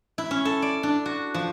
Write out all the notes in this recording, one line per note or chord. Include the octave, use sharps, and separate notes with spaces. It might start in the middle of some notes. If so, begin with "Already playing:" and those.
E4
C#4
A4
D5
D4
F#4
F3